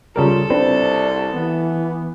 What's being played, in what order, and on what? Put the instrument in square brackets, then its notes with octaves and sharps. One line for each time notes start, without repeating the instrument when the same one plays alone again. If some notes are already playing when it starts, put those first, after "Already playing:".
[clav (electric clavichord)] C#3 G3 A#4 [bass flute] F4 [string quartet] A4
[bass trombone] C2 [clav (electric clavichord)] C4 D4 B4 [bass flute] D5
[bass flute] E3 [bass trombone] B3